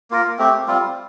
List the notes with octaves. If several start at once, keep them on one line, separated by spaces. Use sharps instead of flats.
A#3 F4 A#4
A3 C4 G4
G3 C4 F4